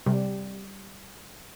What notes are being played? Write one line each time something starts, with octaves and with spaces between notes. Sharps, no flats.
C3 G3